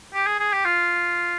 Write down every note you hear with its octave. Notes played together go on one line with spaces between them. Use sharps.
G4
G#4
G#4
G4
F4